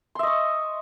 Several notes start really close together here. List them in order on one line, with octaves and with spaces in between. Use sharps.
C6 E5 D#5 C#6